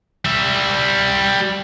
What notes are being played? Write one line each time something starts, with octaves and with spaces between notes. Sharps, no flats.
G3 E5